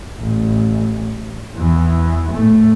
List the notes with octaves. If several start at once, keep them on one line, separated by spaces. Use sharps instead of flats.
A1
E2 E3
A2 A3